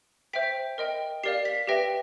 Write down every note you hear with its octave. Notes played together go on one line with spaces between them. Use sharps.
C5 E5 G5 B6
A#4 D#5 G5
G4 A#4 D5 F5 C7
B6
G4 B4 E5 G5 A#6